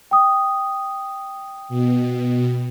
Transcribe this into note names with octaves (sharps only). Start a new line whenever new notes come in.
G5 D#6
B2